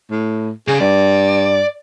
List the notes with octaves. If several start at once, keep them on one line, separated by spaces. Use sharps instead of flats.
A2
C#3 G#4
G2 D5